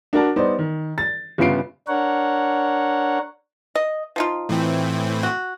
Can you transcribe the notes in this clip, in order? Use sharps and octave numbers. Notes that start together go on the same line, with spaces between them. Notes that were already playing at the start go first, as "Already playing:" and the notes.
D4 F#4 A#4 D5 A5
G3 B3 D#4 C5 D5
D#3
A6
G1 C#3 B3 F4 C7 D7
D4 A#4 C#5 F#5
D#5
F3 D#4 F4
A2 E3 C4
F#4